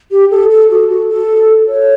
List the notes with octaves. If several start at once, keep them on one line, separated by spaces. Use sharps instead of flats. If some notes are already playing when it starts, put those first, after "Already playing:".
G4
A4
A4
F#4
F#4
A4
C#5